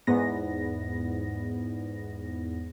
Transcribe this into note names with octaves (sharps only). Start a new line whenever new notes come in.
E2 G#2 B3 A#6